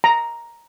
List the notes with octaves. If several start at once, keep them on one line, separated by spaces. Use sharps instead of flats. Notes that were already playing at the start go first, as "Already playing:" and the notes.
A#5